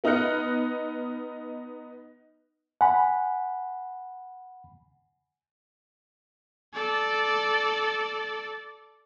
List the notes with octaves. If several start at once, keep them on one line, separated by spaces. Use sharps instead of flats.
B3 D#4 D#5 F6 F#6 C#7
F#5 G#5 B5
A4 D5